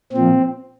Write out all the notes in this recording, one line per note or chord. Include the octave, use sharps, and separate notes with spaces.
A#2 F3 C4